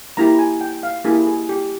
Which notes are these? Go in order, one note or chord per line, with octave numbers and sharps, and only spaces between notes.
A#3 E4 G4 A#5
G#5
G5
F5
A#3 E4 G4 G#4
G#4
G4